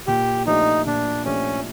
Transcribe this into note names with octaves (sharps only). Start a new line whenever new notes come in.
A#2 G4
F3 A3 D4 D#4 G4
A#2 D4
F3 A3 C#4 D4 G4